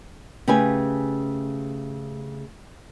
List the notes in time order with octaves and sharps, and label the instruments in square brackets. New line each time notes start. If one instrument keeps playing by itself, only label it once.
[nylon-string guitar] C#3 A3 G4 B4 G#5